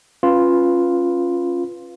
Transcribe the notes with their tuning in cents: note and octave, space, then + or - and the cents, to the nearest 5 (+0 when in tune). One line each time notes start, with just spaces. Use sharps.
C#4 -15 F4 +0 B4 +0